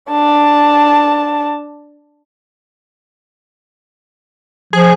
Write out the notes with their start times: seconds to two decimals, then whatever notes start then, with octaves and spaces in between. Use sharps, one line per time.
0.11 D4 A5
4.73 F3 G#4